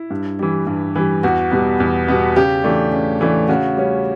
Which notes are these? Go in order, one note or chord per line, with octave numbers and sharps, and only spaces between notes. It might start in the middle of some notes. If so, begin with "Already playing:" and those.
Already playing: E4
G2
E3 G3
G2
E3 G3
E2 F#4
B2 G3 B3
E2
B2 G3 B3
C#3 G4
E3 A3 D4
C#3
E3 A3 D4
C#3 F#4
G3 C#4